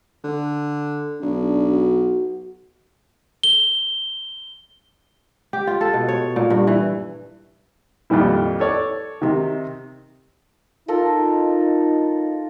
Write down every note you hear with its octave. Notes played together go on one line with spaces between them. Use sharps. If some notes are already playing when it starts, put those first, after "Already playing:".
D3
B1 D4
F#4
G7
G4
F4
A4
B2
C#5
A#2
G2
E3
F2 A#2 D#3 G3 E4
A4 C#5 D5
C3 D#3
D#4 F4 A4 A#4